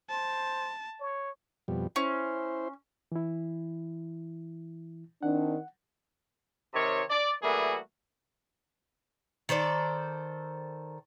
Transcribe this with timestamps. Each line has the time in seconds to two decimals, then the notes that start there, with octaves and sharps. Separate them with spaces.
0.10 C5 A5
1.00 C#5
1.68 F2 B2 G3
1.96 C#4 E4 C5
3.12 E3 E4
5.23 D#3 C4 D4 F#5
6.74 C3 D#3 C#5
7.10 D5
7.42 E3 G3 A3 A#3 F#4 G#4
9.49 D#3 A4 C5 D5